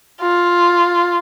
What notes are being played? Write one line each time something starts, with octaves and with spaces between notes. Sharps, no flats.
F4